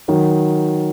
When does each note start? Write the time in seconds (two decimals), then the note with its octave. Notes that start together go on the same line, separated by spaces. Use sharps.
0.08 D#3 F#3